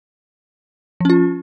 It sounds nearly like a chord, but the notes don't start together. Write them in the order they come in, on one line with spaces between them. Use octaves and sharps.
F3 C#4 F4